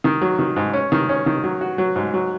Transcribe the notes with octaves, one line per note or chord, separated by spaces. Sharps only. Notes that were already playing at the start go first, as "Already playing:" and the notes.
D#3
F#3
D#3
G#2
C#4
D#3
C#4
D#3
F#3
F#4
F#3
G#2
F#3